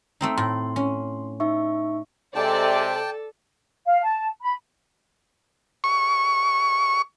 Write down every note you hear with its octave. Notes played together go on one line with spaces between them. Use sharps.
A3 C4 D#4
A2 C6
C#4
D#4 E5 C#6
C3 G#3 A4 D5 G5 A5
A4
F5
A5
B5
C#6